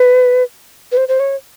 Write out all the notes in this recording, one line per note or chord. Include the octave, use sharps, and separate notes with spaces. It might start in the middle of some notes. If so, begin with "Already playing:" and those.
Already playing: B4
B4
C5
C5
C#5